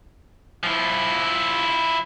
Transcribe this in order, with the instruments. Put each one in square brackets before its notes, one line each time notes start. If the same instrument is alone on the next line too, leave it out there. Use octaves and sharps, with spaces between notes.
[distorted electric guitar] F3 E4